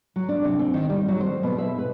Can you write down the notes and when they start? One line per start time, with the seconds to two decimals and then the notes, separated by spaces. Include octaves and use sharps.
0.16 F#3
0.29 D4
0.44 C3
0.59 C4
0.74 D#3
0.90 G3
1.08 F#3
1.20 C5
1.43 B2
1.58 E5
1.79 B4